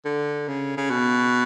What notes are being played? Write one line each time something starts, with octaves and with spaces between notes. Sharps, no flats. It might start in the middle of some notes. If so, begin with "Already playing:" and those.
D3
C#3
C#3
B2